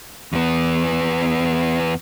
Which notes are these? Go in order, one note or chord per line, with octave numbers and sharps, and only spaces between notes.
E2 B3